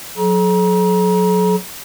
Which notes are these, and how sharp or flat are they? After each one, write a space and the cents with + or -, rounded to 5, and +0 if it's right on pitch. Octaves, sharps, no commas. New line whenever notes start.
F#3 -25 A4 -45 A#5 +35